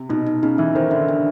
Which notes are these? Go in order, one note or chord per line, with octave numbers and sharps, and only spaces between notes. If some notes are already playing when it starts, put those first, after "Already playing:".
Already playing: C3
B2 D#4
D#4
C#3 D#4
E3 E5
D#3 C5
D3 E5
D4